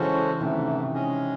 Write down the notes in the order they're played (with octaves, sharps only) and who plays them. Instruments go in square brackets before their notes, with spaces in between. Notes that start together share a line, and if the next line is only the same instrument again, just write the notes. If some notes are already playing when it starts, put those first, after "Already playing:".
Already playing: [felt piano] C#3 E3 [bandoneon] G#3 C#4 F#4 A4 C5
[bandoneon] G#2 E3 A3 [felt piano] C3 D#3
[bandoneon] G#3 C#4 G#4 D#5